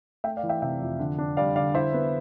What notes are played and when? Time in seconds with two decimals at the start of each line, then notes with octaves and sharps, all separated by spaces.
0.24 A3 E5 G5
0.37 D5 F5
0.43 E3
0.49 E5 G5
0.62 C3 E5 G5
0.81 F2
0.99 D3
1.18 D4
1.37 G3 D5 F5
1.56 D3 D5 F5
1.75 E4 C5 E5
1.94 B3